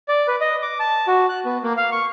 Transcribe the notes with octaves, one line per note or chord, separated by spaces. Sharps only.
D5
B4
D#5
D6
A5
F#4
F#6
B3
A#3
F5
C#6